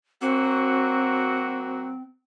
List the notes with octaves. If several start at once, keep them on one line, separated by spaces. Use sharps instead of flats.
F#3 A#3 C4 F#4